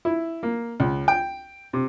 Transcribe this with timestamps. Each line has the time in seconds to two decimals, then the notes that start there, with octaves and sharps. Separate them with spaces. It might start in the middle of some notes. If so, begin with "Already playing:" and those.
0.05 E4
0.43 A#3
0.80 C#2
1.08 G5
1.73 C3